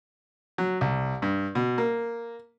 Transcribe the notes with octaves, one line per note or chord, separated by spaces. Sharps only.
F#3
C2
G2
B2
A#3